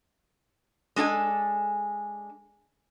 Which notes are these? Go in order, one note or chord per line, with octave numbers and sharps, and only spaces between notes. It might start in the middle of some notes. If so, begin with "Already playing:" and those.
G#3 D4 A4 G#5